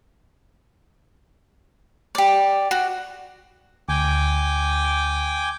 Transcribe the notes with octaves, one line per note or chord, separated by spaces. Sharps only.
G4 D5
F#4
D2 G5 G#5 D6